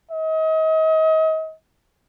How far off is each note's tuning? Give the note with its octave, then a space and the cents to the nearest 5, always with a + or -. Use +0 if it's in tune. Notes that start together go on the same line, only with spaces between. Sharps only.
D#5 +35